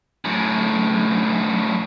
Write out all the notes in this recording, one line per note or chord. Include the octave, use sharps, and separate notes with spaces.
F#2 A2